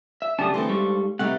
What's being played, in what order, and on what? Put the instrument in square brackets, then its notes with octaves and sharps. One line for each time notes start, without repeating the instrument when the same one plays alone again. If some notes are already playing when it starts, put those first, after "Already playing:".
[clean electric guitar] E5
[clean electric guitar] C#3 D4 G4 [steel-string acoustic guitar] F#3 A3 [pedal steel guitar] A5 D#6
[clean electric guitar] D3 A3 [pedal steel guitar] E3 C4 [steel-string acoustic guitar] A4 C5
[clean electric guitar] G#2 G3 [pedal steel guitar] C#6
[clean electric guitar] C3 [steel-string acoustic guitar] A3 B3 D#4 [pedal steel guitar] F#5 A#5